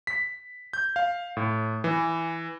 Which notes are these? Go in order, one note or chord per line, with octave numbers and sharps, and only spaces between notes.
B6
G6
F5
A2
E3